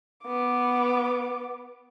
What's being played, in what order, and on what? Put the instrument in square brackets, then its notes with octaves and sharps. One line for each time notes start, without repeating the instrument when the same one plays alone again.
[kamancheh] B3 D6